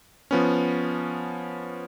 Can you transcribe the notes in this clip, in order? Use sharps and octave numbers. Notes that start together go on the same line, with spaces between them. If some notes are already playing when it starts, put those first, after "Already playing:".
F3 B3 C#4